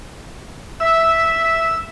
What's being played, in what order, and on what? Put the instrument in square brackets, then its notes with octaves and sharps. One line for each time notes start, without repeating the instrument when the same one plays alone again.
[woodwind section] E5 [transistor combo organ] E6